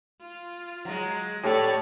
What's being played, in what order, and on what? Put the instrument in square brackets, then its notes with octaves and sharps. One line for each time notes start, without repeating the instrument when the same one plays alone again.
[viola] F4
[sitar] F#3 G#3
[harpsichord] A2 [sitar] G4 [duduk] A4 [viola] C#5 D5